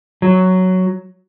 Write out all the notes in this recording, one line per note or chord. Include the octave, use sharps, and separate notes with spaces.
F#3